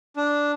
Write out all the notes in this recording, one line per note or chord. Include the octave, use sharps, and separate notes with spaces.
D4